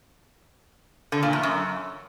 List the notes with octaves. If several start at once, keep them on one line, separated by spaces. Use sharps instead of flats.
D3
A#2
E2
F#2